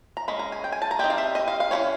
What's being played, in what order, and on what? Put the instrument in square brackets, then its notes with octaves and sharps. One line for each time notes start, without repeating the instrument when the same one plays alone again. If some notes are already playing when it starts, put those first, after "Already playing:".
[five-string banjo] A#5
G#3 C#4 B5
A#5
G#5
G5
G#5
A5
A#5
G3 C4 D#4 G5
F5
E5
D#5
F5
F5
E3 G#3 C#4 C#5